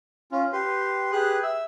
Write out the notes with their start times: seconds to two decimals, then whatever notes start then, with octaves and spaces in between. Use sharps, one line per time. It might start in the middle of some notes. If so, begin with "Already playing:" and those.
0.32 C#4 F4
0.53 G4 B4 C6
1.12 G4 G#4 B4 F#6
1.43 E5 E6